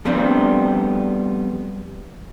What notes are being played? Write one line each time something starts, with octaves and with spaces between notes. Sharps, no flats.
F3 G3 A3 B3 C4 D4